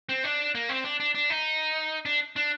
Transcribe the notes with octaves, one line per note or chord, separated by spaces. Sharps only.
C4
D4
A#3
C4
D4
D4
D4
D#4
D4
D4